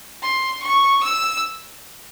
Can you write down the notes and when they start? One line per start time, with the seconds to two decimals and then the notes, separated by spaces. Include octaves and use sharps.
0.22 C6
0.64 C#6
1.04 E6